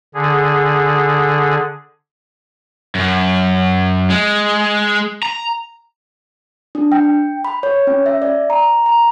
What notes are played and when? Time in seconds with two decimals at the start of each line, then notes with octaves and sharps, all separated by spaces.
0.14 D3 G#4
2.95 F#2
4.10 G#3
5.23 A#5
6.75 D4
6.92 G5
7.45 B5
7.63 C#5
7.87 C#4
8.06 E5
8.22 D5
8.50 A#5
8.86 A#5